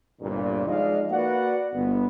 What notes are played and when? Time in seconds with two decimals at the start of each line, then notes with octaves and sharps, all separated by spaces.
0.21 G1 C2 G2 A#2
0.67 F3 G#3 D#4 D5 D#5 F5
1.11 A#3 F#4 B4 D5 F#5
1.73 G1 B3